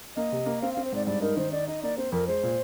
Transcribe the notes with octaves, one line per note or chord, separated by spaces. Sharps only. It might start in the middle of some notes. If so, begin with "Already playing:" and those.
A#3 D#5
C3
A#3
C4 F5
C4 F5
C5
G#2 D5
G2 D5
D#4 A#4
D#3 C5
D#4 D5
D#4 D#5
A#3 D5
C4 C5
F2 A#4
G#3 C5
A#2